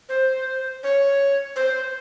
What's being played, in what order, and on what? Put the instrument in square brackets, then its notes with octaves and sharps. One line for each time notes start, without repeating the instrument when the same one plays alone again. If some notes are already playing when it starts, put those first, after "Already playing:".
[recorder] C5
C#5
C5